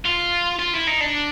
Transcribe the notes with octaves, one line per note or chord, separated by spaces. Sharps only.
F4
F4
E4
D#4
D4